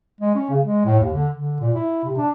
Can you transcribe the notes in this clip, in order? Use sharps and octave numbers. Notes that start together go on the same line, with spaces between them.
G#3
C#4
C#3
G#3
A2
D#2
D3
D3
A#2
E4
C3
D4